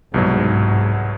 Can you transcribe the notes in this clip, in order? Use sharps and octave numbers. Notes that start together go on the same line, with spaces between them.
C2 G#2 B2 F#3